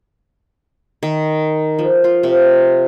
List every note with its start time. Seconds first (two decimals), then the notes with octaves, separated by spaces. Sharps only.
1.03 D#3
1.79 F3
2.04 F4
2.23 C3